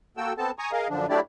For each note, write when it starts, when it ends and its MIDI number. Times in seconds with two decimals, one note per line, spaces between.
0.17 0.33 58
0.17 0.33 66
0.17 0.33 69
0.17 0.33 79
0.17 0.33 88
0.38 0.51 59
0.38 0.51 60
0.38 0.51 69
0.38 0.51 81
0.59 0.71 80
0.59 0.71 82
0.59 0.71 85
0.59 0.71 87
0.72 0.88 68
0.72 0.88 70
0.72 0.88 75
0.72 0.88 77
0.89 1.06 42
0.89 1.06 50
0.89 1.06 53
0.89 1.06 62
1.09 1.20 54
1.09 1.20 57
1.09 1.20 62
1.09 1.20 64
1.09 1.20 67
1.09 1.20 74